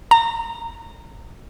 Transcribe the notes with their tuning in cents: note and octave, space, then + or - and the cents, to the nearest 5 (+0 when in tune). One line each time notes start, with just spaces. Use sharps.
A#5 -25